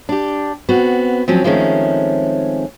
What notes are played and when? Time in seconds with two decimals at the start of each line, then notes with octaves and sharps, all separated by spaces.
0.09 D4 G4
0.69 B3 C4 F#4
1.28 F3 F#3 C4 C#4
1.44 D#3 F3 G#3 A3 C4 C#4